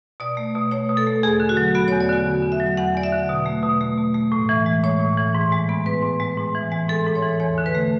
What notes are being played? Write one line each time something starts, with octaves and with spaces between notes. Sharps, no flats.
B2 D5
A3
B2
A3 C#5
B2
A4
A3
E2 G#4
D3
F#4
F#3
B3 F#4
E2 C#5
D5
D3 F#4
E2
D3
E5
F#3
E2 F#5
E2 D5
E5
D3
B2
A3
B2
A3
B2
A3
A2
E3
G#3
A2 C#5
A2
E3
G#2
G#3
B3
G#2 B4
G#2
G#3
G#2
E3
G#3
G#2 A4
G#2
C#5
E3
E2 C#5
D3
B4
A3